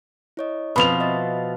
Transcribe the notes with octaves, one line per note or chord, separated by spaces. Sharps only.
E4 C#5 D#5
B2 F3 C4 B5 D#6 F7
D#5 E5 A6